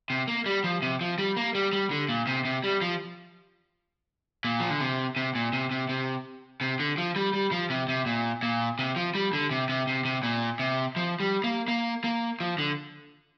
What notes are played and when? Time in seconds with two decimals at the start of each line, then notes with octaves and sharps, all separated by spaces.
0.10 C3
0.28 A#3
0.46 G3
0.64 F3
0.82 C3
1.01 F3
1.18 G3
1.37 A#3
1.55 G3
1.73 G3
1.91 D3
2.09 A#2
2.27 C3
2.45 C3
2.64 G3
2.81 F3
4.44 A#2
4.60 F3
4.70 D3
4.80 C3
5.16 C3
5.35 A#2
5.53 C3
5.71 C3
5.89 C3
6.61 C3
6.80 D3
6.98 F3
7.16 G3
7.33 G3
7.52 F3
7.70 C3
7.89 C3
8.06 A#2
8.43 A#2
8.79 C3
8.96 F3
9.15 G3
9.33 D3
9.51 C3
9.69 C3
9.87 C3
10.05 C3
10.23 A#2
10.59 C3
10.96 F3
11.20 G3
11.44 A#3
11.68 A#3
12.04 A#3
12.40 F3
12.59 D3